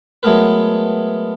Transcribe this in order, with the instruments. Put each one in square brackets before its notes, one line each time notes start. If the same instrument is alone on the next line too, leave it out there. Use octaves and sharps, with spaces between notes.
[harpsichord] F#3 G#3 A3 B3 A#4 B4